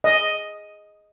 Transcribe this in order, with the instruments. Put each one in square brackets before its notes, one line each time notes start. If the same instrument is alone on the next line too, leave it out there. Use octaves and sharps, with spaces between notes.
[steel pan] D#5